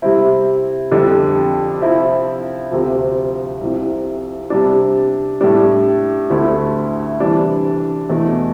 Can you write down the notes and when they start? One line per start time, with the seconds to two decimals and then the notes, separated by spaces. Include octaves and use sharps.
0.02 C3 G3 C4 E4
0.91 F2 D3 G3 D4
1.81 C3 F3 C4 E4
2.71 D2 C3 F3
3.61 C2 C3 F3
4.50 C3 G3 D4
5.41 A2 G3 D4
6.30 D2 D3 A3 E4
7.20 C3 E3 G3 D4
8.10 E2 B2 A3